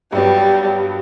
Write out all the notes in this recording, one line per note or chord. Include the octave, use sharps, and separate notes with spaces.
G2 F#3 G3 B3